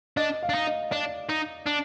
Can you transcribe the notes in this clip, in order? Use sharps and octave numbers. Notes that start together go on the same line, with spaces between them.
D4 D#5
F5
D4
D#4
D#5
D4 D5
D#4
D4